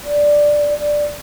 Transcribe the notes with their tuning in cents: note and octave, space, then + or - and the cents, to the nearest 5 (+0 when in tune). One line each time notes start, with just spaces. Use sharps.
D5 +0
D5 +5